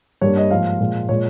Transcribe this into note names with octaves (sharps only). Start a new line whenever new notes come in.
G2 G3 A#3 C#5
D#5
G#2 F3 A#3 F5
A#2 F3 G#3
A#2 G#3 C#5